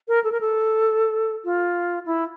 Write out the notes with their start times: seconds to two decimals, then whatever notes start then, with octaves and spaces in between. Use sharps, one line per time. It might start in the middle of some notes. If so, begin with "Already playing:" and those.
0.08 A#4
0.24 A4
0.32 A#4
0.41 A4
1.45 F4
2.06 E4